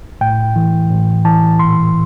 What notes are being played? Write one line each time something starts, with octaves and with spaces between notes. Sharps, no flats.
A2 G5
E3
A2
E3 A5
A#2 C6